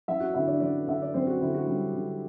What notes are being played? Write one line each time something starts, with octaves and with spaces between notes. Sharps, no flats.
F#2 E4 E5
F#4 F#5
D3 E4 E5
D4 D5
F#2 D4 D5
D3 E5
D5
F#2 C4 C5
F#4
D3 E4
F#4
F#2 G3 G4
D3